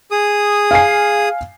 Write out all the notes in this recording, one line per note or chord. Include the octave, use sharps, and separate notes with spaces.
G#4 D#6
F5 G#5 C7